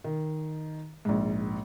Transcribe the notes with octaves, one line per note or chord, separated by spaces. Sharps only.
D#3
A#1 G#2